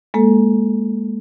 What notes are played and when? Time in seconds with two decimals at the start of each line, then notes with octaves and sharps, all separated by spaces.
0.14 G#3 A#3 A4